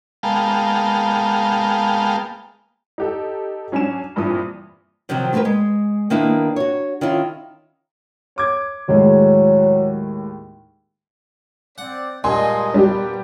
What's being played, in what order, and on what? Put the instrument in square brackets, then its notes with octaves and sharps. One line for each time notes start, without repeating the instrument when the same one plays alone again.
[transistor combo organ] G#3 A#3 B3 F5 G5 A5
[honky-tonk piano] D#4 G4 A4
F#3 C#4 D4 G#5 E7
G2 A#2 E3 C4 D#6
[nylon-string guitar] C3 D#3 F3 F#3 C4
A3 A#3 F#4 A#4 B4
G#3
D#3 A#3 B3 D4 E4 A#4
F#4 C#5
D#3 C#4 E4 F4
[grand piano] C#5 D6 G#6
[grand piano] D#2 A2 G#3 [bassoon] F#3
[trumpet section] C4 D5 [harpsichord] F#5
[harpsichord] G2 A#2 [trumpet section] G#3 A#3 D#5 [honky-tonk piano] G#5 C6
[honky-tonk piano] G3 G4 [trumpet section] B3 B4